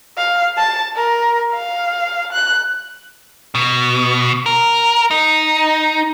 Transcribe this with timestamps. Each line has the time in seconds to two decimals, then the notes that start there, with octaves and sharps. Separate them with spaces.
0.17 F5
0.57 A5
0.95 A#4
1.53 F5
2.33 F#6
3.55 B2
4.46 A#4
5.11 D#4